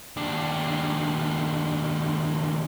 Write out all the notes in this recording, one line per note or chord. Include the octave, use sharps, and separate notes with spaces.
D#2 D4